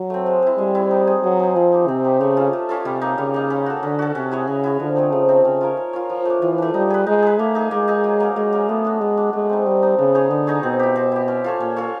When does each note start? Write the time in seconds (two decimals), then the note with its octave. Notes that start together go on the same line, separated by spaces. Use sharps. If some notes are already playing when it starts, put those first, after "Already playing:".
Already playing: F#3
0.10 A3 C4
0.26 G#3
0.42 C4 E4
0.58 G3 G#3
0.75 C4 E4
0.91 D#4
1.07 G#4 C5
1.23 F#3 D#4
1.39 G#4 C5
1.56 F3 C4
1.72 D#4 G4
1.88 C3 C4
2.04 D#4 G4
2.20 C#3 A3
2.37 C#4 F4 A4
2.53 A3
2.69 C#4 F4 A4
2.85 C3 G3
3.01 A#3 D#4
3.18 C#3 G3
3.34 A#3 D#4
3.50 C#4
3.66 F#4 A4
3.82 D3 C#4
3.99 F#4 A4
4.15 C3 C#4
4.31 E4 G#4 C#5
4.47 C#3 C#4
4.64 E4 G#4 C#5
4.80 D3 F3
4.95 A3 C4 D#4
5.12 C#3 F3
5.28 A3 C4 D#4
5.44 C#3 C#4
5.61 F4 A#4 C#5
5.77 C#4
5.93 F4 A#4 C#5
6.09 F3
6.25 A3 D4
6.41 E3 F3
6.58 A3 D4
6.74 G3 D#4
6.90 G#4 B4
7.07 G#3 D#4
7.22 G#4 B4
7.39 A3 A#3
7.55 D#4 G#4
7.71 G#3 A#3
7.88 D#4 G#4
8.04 F#3
8.20 A#3 C#4
8.36 F#3 G#3
8.52 A#3 C#4
8.69 A3 B3
8.85 D4 F#4
9.00 G#3 B3
9.17 D4 F#4
9.33 G#3 A3
9.49 C4 D#4
9.66 G3 A3
9.82 C4 D#4
9.98 C#3 B3
10.15 D#4 G#4 C#5
10.30 D3 B3
10.47 D#4 G#4 C#5
10.63 B2 C4
10.79 E4 G4
10.96 C4
11.12 E4 G4
11.28 C#4
11.44 F4 A4 C#5
11.60 A#2 C#4
11.76 F4 A4 C#5